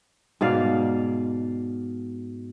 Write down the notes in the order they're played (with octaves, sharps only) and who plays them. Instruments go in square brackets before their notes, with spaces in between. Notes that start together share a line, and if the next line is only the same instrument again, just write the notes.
[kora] G#2 B2 D5 F5